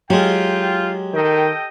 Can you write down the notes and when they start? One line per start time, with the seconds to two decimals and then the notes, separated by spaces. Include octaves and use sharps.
0.10 F#3 G#3 F4 G4 G5
1.14 D#3 A4 D#5 G5